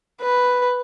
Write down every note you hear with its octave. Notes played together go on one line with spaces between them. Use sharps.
B4